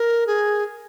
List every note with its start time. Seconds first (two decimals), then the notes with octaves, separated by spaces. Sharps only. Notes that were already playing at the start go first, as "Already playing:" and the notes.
Already playing: A#4
0.27 G#4